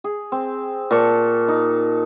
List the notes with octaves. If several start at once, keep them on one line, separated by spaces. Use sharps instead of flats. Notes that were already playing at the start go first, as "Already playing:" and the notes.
G#4
C4
A#2 A4 A5 C#6
D#4